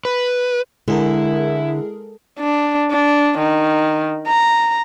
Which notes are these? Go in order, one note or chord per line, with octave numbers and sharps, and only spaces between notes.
B4
D3 G#3 E4 G#4 A#4
D4
D4
D#3
A#5